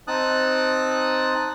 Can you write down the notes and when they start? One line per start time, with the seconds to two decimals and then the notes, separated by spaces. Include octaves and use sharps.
0.08 C4 D#4 A5 D#6 F#6